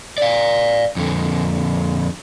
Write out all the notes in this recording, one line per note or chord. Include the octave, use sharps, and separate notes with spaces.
D5 F5
F2 D3